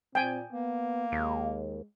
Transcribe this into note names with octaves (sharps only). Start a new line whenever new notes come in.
A#2 C4 G5 G#5
A#3 B3
D#2 G#3